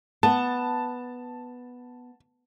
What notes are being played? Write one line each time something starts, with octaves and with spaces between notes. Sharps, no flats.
B3 A5